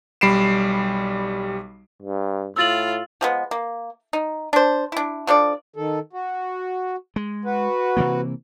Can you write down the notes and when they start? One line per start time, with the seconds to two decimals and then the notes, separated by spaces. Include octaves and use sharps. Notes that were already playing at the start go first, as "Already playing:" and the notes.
0.21 B1 G3 B5 C7 D7 E7
2.02 G2
2.56 A2 F4 E6 A6 F#7
3.21 F3 G#3 B3
3.51 A#3
4.13 D#4
4.53 D4 C5
4.92 D4 E4
5.27 F3 D4 A4 D5
5.76 D#3 A4
6.13 F#4
7.16 G#3
7.45 F#4 B4
7.97 C3 E3 A#3